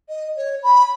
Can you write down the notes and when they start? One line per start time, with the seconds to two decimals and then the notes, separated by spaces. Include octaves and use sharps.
0.09 D#5
0.36 C#5
0.63 B5